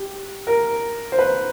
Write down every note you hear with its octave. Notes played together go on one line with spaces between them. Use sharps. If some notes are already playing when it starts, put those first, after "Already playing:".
Already playing: G4
A#4
C5
B4